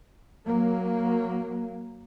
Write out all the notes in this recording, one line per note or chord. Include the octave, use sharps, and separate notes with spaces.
F#3 A#3